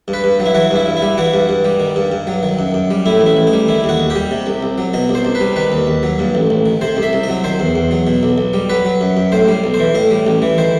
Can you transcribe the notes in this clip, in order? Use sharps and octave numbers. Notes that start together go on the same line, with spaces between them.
G2
B4
G2
F#3
E4
E3 F#4
G2 E4
G2
E4
G3
E3 F#4
G2
G2
G3
D#3
G2
G2
F#3
D#3
F#2
F#2
G3
A2 E4
A1
E4
A1
D#4
G3
D#3 E4
D#2 F#4
D#2
G4
G3
C3
C2
C2
F#3
B2 D#5
C2
C5
C2
B4
G3
D#3 B4
D#2
D#2
F#3
G2
A1
A1
D#3
C3 C5
C2
E5
C2
D#5
F#3
D#3 C5
E2
E2
F#3
B2
B1
B1
G3
F#3 B4
F#3
F#2
F#2
A2 C5
G3
B1
C5
E3
A2 D#5
G3
A1
E3
D#3 C5